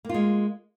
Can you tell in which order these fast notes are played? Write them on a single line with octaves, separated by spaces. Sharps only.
A#3 F4 G#3